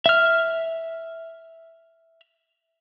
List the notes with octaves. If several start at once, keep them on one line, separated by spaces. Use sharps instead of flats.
E5 F6